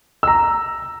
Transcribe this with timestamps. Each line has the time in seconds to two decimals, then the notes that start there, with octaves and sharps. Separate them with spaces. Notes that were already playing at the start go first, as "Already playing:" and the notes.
0.23 A#5 E6